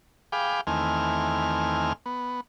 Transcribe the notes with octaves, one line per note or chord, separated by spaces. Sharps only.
G#4 F5 G5 B5 D6
E2 D#3 A3 C4 G#5 F6
B3